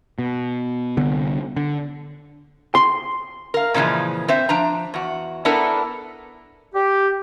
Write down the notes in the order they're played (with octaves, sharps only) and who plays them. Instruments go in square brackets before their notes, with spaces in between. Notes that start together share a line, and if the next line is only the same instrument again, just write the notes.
[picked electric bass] B2
C2 D3 B3
D3
[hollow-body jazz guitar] C6
[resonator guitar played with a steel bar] A#4 F5
A#2 C#3 E3 F3 G#3
C4 C5 E5
F3 D4 A#5
E2 F#4
B3 D4 E4 A4 A#4
[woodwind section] G4